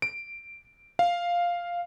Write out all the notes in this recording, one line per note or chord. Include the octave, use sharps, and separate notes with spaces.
D7
F5